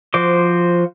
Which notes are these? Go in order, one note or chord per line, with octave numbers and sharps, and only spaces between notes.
F3 F#4 C5 D6